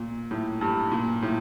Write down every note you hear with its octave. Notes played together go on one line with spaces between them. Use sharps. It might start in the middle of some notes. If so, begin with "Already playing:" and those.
Already playing: A#2
A2
G2
A#2
A2